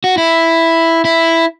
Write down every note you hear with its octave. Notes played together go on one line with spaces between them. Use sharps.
F#4
E4
E4